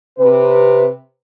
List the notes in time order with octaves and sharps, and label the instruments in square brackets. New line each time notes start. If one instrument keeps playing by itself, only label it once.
[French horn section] C3 B4